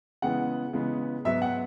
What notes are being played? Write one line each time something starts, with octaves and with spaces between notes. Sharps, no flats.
C#3 E3 G#3 B3 F#5
C#3 E3 G#3 B3
G#2 F#3 B3 E5
F#5